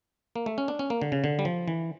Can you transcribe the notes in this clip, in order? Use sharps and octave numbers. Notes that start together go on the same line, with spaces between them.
A#3
A3
C#4
D4
C#4
A#3
D3
C#3
D3
G3
F3
E3